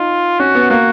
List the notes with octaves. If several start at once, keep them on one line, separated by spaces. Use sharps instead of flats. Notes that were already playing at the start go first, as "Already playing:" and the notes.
Already playing: D#4 F4
C#4 F#4
B3
A#3 F#4